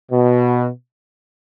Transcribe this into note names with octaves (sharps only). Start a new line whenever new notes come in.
B2